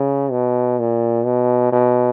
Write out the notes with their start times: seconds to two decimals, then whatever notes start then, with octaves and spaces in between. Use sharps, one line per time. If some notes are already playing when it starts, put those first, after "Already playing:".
Already playing: C#3
0.31 B2
0.79 A#2
1.25 B2
1.72 B2